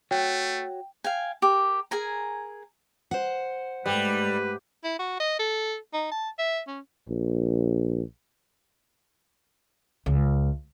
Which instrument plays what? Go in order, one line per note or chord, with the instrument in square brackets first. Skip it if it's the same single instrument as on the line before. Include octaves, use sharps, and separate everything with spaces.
[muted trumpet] A3 [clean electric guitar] F#4 C#5 [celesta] G5
[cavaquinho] F5 G5 G#5
G4 A#4
G#4 A#4 G#5 A#5
[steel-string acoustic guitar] C5 F#5
[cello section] G#2 A3 [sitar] G3 [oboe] B4
[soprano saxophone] E4
F#4
D#5
A4
D#4
A5
E5
C#4
[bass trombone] A#1
[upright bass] C#2